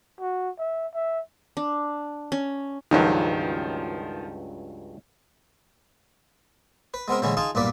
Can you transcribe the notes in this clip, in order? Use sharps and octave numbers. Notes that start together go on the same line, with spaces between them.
F#4
E5
E5
D4
C#4
C#2 G2 D#3 F3 F#3
B4
G#3 B3 C4 A#4
A#1 D3 E3 G#3 C#4 E4
D#4 F4 G#4 A5
B1 G2 A#2 A#3 B4 D5